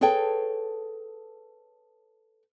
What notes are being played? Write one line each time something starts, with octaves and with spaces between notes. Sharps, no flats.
G#4 A4 B4 C#5 G5 A5